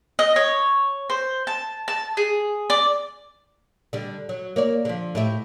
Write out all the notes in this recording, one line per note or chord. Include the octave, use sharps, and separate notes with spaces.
D#5
C#5
C5
A5
A5
G#4
D5
D3 G3
F#3
A#3 C#5 D5
D3 F3
A2 G4 E5